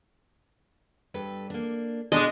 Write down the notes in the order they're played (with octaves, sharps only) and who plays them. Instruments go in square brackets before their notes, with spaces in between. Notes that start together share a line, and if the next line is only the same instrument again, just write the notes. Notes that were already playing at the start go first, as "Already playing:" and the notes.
[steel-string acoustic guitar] G2 A4 B4
A#3 D4
[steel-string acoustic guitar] B2 A4 [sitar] G#3 D4 [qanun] D#5